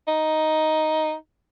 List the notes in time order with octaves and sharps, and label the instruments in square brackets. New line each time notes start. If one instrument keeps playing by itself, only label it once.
[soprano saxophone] D#4